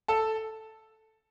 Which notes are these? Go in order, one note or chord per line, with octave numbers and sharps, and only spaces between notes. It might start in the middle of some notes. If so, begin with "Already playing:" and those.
A4 A5